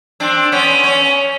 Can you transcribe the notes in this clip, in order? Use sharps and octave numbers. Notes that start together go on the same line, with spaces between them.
C4 D4
B3 C#4
C#4